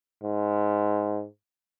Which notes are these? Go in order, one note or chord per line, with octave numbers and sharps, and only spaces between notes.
G#2